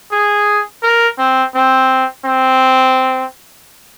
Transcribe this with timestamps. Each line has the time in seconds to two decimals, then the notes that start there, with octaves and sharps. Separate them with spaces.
0.12 G#4
0.83 A#4
1.18 C4
1.55 C4
2.25 C4